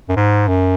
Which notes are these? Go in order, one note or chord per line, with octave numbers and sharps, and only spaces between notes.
F#2
G#2
F#2